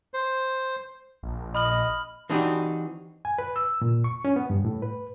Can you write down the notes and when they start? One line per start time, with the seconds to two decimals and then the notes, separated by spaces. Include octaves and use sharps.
0.14 C5
1.23 A#1
1.55 D#5 B5 F6 F#7
2.30 E3 C4 D4 D#4 F#4 G4
3.25 G#5
3.38 B4
3.56 E6
3.82 A#2
4.04 C#6
4.25 C#4
4.36 B3
4.50 G2
4.65 A2
4.82 B4